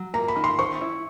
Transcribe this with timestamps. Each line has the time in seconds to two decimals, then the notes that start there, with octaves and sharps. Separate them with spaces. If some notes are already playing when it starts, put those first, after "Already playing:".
Already playing: F#3
0.14 A#3 A#5
0.28 B5
0.36 D#3
0.44 C6
0.59 C5 C#6
0.81 E4